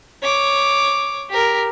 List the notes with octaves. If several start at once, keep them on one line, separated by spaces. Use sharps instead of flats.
C#5 D6
G4 A#4